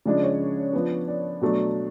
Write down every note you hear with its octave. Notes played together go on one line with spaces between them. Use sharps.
C#3 F3 G#3 D4 D5
C#5
F3 B3 D4
D5
B2 F#3 A3 D4